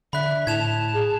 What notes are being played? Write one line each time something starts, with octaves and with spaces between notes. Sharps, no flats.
D3 E5 B5 F#6
A2 A5 G#6 E7 F7
G#4